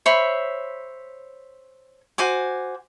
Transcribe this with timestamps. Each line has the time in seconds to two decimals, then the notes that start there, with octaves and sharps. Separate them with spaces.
0.06 C5 C#5 E5 B5
2.18 F#4 C5 G#5 D6